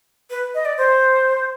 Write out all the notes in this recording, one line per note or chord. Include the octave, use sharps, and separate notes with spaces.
B4
D#5
D5
C5